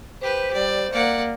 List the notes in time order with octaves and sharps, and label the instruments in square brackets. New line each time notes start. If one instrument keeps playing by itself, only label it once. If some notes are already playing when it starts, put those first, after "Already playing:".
[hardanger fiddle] G4 B4 [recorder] C5
[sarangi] G3 [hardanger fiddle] D5
[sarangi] A#3 [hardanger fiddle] D5 F#5